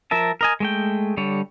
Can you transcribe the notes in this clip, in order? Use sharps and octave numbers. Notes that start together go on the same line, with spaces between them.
F3 A#4 E5 A5
A#4 D#5 G#5
G#3 A3 G5
D3 G3 C#5